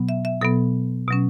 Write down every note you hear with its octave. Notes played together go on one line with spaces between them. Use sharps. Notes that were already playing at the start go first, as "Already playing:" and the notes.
Already playing: B2 F#3 B3
E5
E5
B2 F#3 B3 A4
B2 F#3 C#4